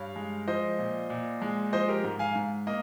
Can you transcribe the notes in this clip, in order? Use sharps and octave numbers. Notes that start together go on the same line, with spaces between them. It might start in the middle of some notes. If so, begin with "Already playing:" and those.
Already playing: G2 C#5 F5
G#3
F3 C5 D#5
A#2
A#2
G#3
F3 C5 D#5
G4 A#4
G#2
F5 G#5
G#2
A#3 D#5